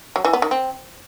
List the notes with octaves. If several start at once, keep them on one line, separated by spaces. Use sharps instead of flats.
F#3
E3
B3
D#3
C4